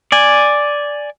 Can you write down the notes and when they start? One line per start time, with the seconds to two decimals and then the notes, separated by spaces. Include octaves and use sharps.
0.12 D5 G#5